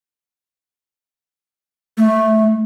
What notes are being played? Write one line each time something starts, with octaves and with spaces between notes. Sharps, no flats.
A3